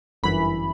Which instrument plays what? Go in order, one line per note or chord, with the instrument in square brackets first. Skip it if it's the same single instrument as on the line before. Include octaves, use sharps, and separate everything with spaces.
[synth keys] G1 F#2 E3 B5